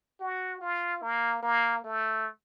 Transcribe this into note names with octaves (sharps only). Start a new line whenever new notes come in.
F#4
F4
A#3
A#3
A3